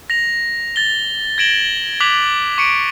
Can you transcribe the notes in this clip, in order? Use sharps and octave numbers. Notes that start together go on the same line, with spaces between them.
A#6 F7
A6 G7
G#6 A#6 D7 E7 F#7 G7
D6 F#6 G#6 B6 F7 F#7
C#6 C#7 D7